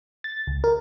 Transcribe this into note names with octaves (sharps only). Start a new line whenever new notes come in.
A6
C#2
A#4